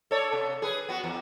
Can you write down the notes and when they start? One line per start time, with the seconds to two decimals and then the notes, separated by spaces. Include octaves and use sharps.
0.11 A4 C#5 D5
0.33 C3
0.62 G#4 B4
0.89 B3 F#4
1.04 E2